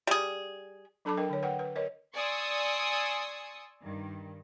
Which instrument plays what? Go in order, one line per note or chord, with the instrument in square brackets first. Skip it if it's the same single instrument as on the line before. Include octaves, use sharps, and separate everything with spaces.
[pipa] G3 G#4
[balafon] F#3 D4 A4 A5 B5 D6
D4 A#4 D#5 G5
D3 C#5
B4 F#5 G5
B4
A#4 C#5 D#5
[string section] D5 G#5 C6 C#6 D#6 E6
G2 D#3